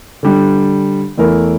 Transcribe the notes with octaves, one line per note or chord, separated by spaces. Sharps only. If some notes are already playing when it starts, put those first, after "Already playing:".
D3 G3 D4
E2 E3 A3 E4 A#4